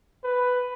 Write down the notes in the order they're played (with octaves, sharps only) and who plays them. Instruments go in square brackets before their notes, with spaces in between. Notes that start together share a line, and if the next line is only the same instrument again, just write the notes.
[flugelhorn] B4